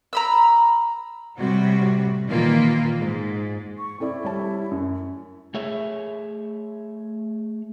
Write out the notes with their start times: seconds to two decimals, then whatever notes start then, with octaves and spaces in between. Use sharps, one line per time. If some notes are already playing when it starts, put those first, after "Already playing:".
0.13 A#5 B5 E6
1.37 A2 C3 G3 F#4
2.27 A#2 D#3 E3 A#3 F4
2.97 G#2
3.78 C#6
4.00 C4 E4 A4 D5
4.24 G3 C#5 A5
4.71 F#2
5.54 A3 G#4 C#5 E5